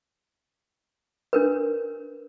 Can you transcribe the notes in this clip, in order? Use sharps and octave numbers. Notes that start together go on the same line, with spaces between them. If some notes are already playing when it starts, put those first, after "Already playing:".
D4 A#4 B4